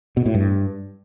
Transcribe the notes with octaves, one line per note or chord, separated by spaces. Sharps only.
B2
A2
G2